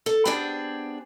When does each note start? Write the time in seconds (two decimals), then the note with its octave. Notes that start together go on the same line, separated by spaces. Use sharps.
0.06 A4
0.25 B3 C4 D4 G4 G#4